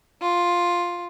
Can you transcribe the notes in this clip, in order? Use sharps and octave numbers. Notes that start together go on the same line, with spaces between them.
F4